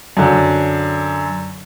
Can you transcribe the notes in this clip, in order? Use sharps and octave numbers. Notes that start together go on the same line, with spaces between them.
F#2 D3